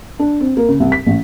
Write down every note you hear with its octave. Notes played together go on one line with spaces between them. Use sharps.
D4
C4
A#3
C#3
C2
B6
A1